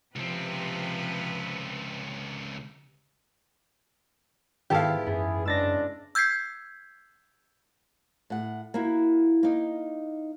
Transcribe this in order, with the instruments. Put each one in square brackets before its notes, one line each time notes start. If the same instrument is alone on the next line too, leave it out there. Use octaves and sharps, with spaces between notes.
[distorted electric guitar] C#2 C4 [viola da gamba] C3 F3 B4
[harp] G#2 B3 E4 [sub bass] D#3 [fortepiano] G4 A4 F5
[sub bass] F#2 [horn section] E3 E4 G#4 [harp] B3
[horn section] C#3 G#3 D4 [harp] E6 A6 A#6
[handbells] E6 G6 G#6 B6 C7
[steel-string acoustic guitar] A2 F#5
A#3 E4 F#4
A#3 D#4